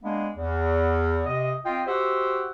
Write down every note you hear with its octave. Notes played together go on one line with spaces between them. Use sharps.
G#3 A#3 B3 D4
E2
C3 D#5
C4 F4 D#5 G5
F#4 G4 C5 E5 F#5